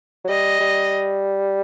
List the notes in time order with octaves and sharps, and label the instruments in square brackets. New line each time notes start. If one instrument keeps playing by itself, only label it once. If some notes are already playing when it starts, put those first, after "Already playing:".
[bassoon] F#3
[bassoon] G3 [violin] D#5
[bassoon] G3